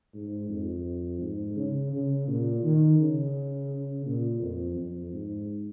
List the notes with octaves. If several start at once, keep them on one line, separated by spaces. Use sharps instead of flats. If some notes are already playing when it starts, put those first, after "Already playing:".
G#2
F2
G#2
C#3
C#3
A#2
D#3
C#3
A#2
F2
F2
G#2